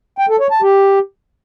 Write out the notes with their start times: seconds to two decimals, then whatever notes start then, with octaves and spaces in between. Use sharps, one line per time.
0.18 G5
0.29 A4
0.40 C#5
0.51 A5
0.62 G4